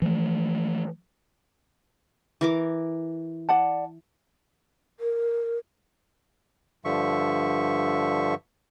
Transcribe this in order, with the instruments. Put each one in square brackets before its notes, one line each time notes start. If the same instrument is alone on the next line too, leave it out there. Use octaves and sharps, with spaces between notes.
[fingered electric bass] E3 F3 A3
[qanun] E3 A#4 D6
[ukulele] D5 F#5 A5
[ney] A#4
[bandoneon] G2 D3 F3 E5 C#6